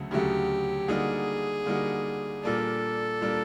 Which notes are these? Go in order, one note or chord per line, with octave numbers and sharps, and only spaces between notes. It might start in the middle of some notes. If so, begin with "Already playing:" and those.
Already playing: D2 C#3 F#3 A3
D2 C#3 F#3 A3 G4
D3 G3 A#3 D#4 F#4 G#4
D3 G3 A#3 D#4 F#4
A#2 G3 A#3 D4 A4
A#2 G3 A#3 D4